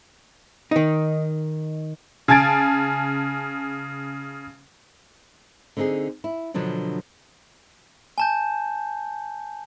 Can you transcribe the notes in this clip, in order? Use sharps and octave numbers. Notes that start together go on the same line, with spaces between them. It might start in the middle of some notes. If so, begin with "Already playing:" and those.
D#3 D#4
C#3 G#5 A5 G#6 A6 D7
D3 C4 D#4 F4 G#4
E4
B2 D3 F3 F#3 D4
G#5 A5 G6